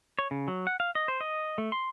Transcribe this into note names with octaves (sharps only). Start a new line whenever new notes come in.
C#5
C#3
F#3
F#5
F5
D#5
C5
D#5
A3
C6